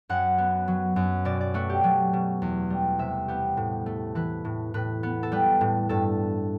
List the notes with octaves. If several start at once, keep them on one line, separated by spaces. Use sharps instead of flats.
F#2 F#5
B3
F#3
F#2
B2 D5
D5
A3 F#4
G4
F#3
B2
E2
G3
C3 E5
B3 G4
A2
A3
E3 B4
A2
A2 B4
B3
A4
G3 B4
A2
G2 A4